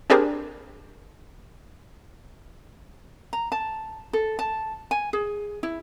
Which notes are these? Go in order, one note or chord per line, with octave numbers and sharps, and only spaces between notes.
C4 D4 G4 G#4 A#4
A#5
A5
A4
A5
G#5
G#4
E4